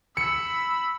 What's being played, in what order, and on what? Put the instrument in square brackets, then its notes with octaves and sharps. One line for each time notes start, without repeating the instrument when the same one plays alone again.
[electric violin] B5 E6 [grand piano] C#7